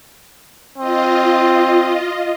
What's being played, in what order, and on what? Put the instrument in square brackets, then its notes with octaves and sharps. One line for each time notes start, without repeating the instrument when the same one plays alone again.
[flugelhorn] C4 [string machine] F4 D#5